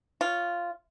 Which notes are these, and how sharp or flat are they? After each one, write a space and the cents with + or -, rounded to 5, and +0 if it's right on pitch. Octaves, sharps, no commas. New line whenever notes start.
F4 -5 C#5 +0